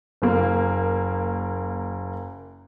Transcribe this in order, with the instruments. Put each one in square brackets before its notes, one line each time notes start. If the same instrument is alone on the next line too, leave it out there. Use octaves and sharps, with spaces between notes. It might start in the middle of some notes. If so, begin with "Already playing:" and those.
[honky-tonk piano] F#1 A#3